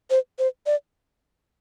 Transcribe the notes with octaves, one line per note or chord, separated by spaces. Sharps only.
C5
C5
D5